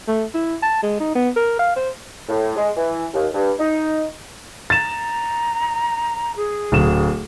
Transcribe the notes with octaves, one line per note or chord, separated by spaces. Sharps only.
A3
E4
A5
G#3
D#4
B3
A#4
F5
C5
A2
G#3
E3
D#2
G2
D#4
A#5 A6 E7
G#4
D1 E7